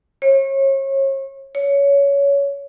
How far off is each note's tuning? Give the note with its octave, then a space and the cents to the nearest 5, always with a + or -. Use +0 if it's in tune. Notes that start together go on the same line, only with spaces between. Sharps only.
C#5 -35
C#5 +20